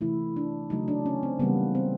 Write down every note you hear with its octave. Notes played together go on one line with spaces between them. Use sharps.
C3 E3 A3 E4
D4
C#3 F#3 A3 D#4
D4
C#4
C4
C#3 E3 G3 A#3 B3
C4